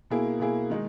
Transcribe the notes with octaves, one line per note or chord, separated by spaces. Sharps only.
B2 A#3 E4 G#4
B2 A#3 E4 G#4
D#3 G#3 D#4